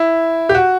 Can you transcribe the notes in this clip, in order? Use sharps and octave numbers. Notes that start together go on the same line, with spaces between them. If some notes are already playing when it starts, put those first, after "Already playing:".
Already playing: E4
G4
F#4